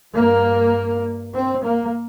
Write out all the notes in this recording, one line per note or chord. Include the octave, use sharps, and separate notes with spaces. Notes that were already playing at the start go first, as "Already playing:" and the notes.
G2 A#3
C4
A#3